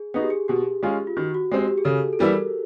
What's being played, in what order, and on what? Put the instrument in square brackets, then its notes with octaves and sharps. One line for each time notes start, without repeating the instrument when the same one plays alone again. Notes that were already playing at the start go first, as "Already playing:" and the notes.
Already playing: [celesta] G#4
[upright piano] B3 D#4 F#4 [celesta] G#4
[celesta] G4
G#4
[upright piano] B2 [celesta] G4
[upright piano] G#3 C#4 F4
[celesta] F4
[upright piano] D#3 [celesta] F#4
[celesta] F#4
[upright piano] G#3 C4 [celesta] G4
[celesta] G4
G#4
[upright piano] C#3 [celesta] A4
[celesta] A4
[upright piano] E3 G3 B3 E4 [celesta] A#4